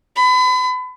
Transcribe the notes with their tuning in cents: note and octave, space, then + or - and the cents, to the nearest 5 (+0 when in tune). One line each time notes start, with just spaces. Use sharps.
B5 +35